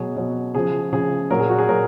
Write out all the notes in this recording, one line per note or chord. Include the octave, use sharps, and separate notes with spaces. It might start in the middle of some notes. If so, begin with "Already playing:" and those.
Already playing: B2 F#3 G#4
B2 F#3
C#3 F3 G#4
C#3 F3 G#4
A#2 F#3 A#4
G#4
F#4
G#4
A#2 F#3 A#4